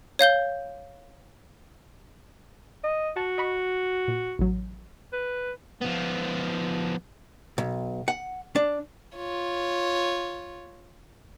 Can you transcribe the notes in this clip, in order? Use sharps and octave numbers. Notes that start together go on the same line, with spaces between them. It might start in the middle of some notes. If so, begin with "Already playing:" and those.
C#5 F5 G6 G7
D#5
F#4 A5
D#5 B5 C#6
A#2
A1 F#3
B4
F3 B3
B1
F#5
D4
F4 C#5